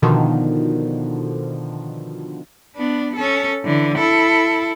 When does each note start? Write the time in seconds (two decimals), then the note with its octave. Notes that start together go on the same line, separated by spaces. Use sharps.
0.02 B2 D3 D#3 F3
2.76 B3 D4
3.16 C#4 A4
3.64 D3 E3
3.97 E4 A4